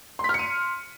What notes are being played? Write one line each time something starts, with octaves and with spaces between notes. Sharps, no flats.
C6 F6 B6 C#7 D#7